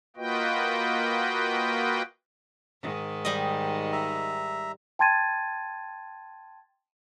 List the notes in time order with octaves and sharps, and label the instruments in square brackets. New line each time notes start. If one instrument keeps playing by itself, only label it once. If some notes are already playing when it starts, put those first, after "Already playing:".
[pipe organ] A#3 F4 F#4 B4 D#5 G5
[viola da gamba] G#2 D#3
[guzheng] G3 D#5
[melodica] E5 A#5
[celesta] G5 A5 C6 G#6 A6 D#7